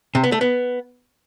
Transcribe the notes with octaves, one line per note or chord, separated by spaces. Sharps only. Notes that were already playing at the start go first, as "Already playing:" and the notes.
C3
B3
A3
B3